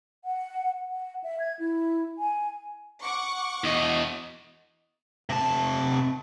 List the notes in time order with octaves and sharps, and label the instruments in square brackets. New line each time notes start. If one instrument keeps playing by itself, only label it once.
[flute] F#5
F#5
E5
G#6
E4
G#5
[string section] F#5 C#6 D6
[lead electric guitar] E2 D#5
[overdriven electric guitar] C3 A5